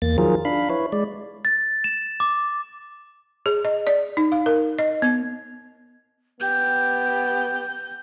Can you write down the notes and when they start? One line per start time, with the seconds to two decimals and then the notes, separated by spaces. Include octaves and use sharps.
0.02 E2 A#3 A6
0.18 D#3 F3 F#3 F4 G#4 A#4
0.45 D4 F5 B5
0.70 E4 B4 C#5
0.92 G#3 D5
1.45 A6
1.84 E7
2.20 D6
3.46 G#4
3.65 D#5
3.87 D5
4.17 D#4
4.32 F5
4.46 A#4
4.79 D#5
5.02 B3
6.40 B3 G4 G6